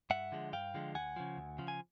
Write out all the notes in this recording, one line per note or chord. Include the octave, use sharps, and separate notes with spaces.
G2 E5 F#5
D3 F3 G#3
G2 F5 G5
D3 F3 G#3
D2 F#5 G#5
C#3 F3
D2
C#3 F3
G#5